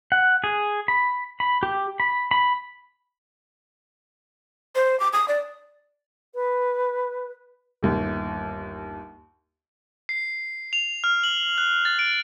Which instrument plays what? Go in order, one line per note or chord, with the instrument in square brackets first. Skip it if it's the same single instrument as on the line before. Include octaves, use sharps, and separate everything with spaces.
[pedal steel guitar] F#5
G#4
B5
B5
G4
B5
B5
[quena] C5
D6
D#6
D5
[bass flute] B4
[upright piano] G1 D#2
[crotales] C7
F7
F6
F#7
F#6
A6
D7